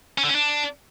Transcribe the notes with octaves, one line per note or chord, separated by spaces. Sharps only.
C#4
D3
C#4
D4